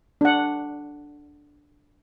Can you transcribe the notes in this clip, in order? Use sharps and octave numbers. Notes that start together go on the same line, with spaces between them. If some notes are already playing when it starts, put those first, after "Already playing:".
D4 F#5